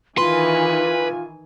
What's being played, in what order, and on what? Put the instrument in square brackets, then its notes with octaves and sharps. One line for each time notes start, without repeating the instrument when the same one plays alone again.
[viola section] D#3 E3 G#5 [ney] F4 [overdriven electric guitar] B4 [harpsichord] C6